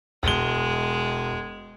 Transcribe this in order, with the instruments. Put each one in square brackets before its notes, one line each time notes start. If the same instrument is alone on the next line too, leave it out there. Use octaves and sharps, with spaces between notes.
[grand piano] E1 G7 [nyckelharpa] G#3